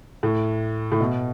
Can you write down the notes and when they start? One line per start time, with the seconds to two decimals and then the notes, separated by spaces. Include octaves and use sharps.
0.23 A2
0.92 A2
1.00 B2